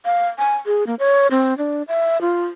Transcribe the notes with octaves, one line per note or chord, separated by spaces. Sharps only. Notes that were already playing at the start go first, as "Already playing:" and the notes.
F5
G#5
G#4
A#3
C#5
C4
D4
E5
F4